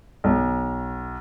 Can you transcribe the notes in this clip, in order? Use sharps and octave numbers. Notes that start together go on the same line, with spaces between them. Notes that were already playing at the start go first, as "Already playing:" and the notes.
B1